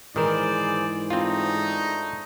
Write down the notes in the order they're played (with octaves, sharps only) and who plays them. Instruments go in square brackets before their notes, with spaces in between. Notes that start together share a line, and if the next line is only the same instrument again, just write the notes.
[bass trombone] G#2 [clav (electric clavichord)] D#3 [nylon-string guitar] E3 A#4 [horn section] G#4 C5 D5
[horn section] A3 D4 D#4 [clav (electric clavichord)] C4 F4